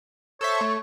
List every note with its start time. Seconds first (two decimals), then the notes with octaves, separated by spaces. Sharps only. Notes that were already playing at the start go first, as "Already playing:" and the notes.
0.41 A4 C5 C#5 E5
0.61 A3